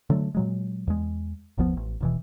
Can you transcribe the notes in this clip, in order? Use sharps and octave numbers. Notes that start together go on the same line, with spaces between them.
D3 F#3 A3
A#2 F#3 G#3
E2 G#3
G1 D#2 F3 B3
A1
D#1 B2 E3